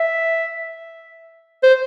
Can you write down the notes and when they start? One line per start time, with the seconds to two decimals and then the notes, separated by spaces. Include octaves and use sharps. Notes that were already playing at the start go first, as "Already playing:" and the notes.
Already playing: E5
1.63 C5